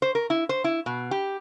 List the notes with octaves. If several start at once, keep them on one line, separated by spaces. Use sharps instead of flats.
C5
A#4
E4
C5
E4
B2
G4